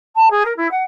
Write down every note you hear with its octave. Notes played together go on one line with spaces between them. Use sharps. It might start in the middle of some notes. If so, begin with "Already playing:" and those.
A5
G#4
A#4
E4
F#5